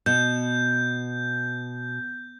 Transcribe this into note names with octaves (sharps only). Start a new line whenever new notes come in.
B2 G6